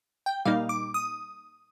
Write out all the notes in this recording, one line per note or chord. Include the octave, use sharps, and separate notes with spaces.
G5
A#2 G3 A#3 D#4 F5
D6
D#6